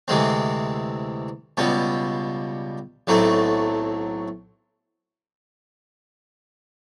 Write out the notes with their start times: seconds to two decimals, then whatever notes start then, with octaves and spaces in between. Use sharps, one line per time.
0.08 D2 C3 E3 G#3 C4
1.57 C#2 B2 G3 B3
3.07 B1 A2 F#3 A3 C4